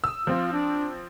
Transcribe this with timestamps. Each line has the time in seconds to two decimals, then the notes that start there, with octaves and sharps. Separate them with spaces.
0.04 D#6 E6
0.27 F3 C4 F4
0.53 D4